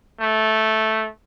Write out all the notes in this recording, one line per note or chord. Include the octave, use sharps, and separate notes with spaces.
A3